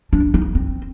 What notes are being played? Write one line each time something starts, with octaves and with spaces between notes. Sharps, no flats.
D4
D#4
C4